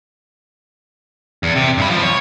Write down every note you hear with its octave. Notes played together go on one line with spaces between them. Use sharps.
E2
C3
G2 B5
F3
C#5